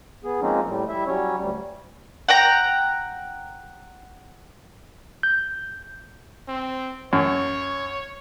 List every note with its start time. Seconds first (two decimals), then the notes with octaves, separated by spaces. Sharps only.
0.24 B3 G#4
0.42 F3 G#3 A#3 C4 C#4 D#4
0.67 A2 G3
0.89 G3 E4 E5
1.07 F#3 G3 C#4 C#5
1.38 D2 G3
2.28 F#5 G5 A#5
5.23 G6
6.48 C4
7.13 F#2 C#5